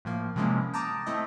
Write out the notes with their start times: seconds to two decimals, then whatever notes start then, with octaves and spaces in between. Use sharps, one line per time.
0.05 A2 F3 A#3
0.36 C3 E3 F3 G#3 A#3 C#4
0.74 G5 A5 A#5 D6 D#6
1.06 A3 C4 E4 D#5